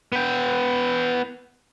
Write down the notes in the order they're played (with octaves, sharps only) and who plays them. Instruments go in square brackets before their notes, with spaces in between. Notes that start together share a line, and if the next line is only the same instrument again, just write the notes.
[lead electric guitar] B3 G5